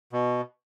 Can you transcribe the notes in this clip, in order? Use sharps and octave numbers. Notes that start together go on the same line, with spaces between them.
B2